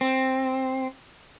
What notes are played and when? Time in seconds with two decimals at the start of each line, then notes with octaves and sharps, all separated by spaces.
0.01 C4